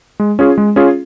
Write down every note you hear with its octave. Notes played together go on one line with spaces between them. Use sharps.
G#3
C#4 F4 G#4
G#3
C#4 F4 G#4